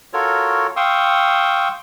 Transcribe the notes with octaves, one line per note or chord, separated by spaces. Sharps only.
F4 F#4 A4 A#4 C#5
F5 G5 C6 C#6 D#6 E6